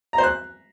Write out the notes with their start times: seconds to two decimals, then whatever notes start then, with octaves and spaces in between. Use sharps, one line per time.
0.13 A#5
0.18 C5
0.23 F#6